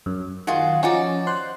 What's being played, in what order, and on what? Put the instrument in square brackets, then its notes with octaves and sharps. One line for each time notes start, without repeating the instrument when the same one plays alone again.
[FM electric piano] F#2
[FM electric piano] D#3 [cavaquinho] F4 F#4 G#4
[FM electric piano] F3 C#4 [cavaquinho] D#4 F#4 D5
[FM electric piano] C5 C6 F#6